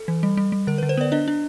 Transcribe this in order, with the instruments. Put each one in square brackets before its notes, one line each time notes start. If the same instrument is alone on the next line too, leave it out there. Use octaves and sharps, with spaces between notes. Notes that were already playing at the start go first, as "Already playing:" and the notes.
Already playing: [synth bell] A4
E3
G3
G3
G3
D3 A#4
D3 B4
C5
B3 D5
D4 D#5
D4